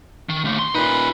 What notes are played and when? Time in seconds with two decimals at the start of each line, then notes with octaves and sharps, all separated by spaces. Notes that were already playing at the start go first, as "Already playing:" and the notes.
0.29 D#3
0.45 D#2 A3
0.59 C6
0.74 A#2 D#4 F4 B4 B5